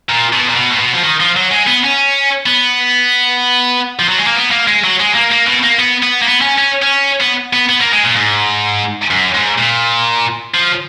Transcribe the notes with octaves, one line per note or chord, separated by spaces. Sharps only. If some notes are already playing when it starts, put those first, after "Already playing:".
A#2
B2
A#2
B2
A#2
B2
F3
D#3
F3
F#3
G#3
B3
C#4
B3
F3
F#3
G#3
A#3
B3
A#3
G#3
F#3
G#3
A#3
A#3
B2
A#3
B3
B3
A#3
B3
C#4
C#4
C#4
B3
B3
B3
A#3
G#3
A#2
G#2
F#2
G#2
A#2
F3